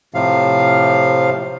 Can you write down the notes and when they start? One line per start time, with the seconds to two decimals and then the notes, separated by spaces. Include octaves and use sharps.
0.14 A2 C3 F3 F5